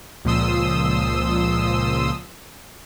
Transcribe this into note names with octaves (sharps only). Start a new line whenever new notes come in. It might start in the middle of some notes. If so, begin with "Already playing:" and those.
C#2 A#2 F3 C6 D#6 E6